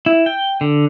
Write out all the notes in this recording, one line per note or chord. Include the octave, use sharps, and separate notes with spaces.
E4
G5
D3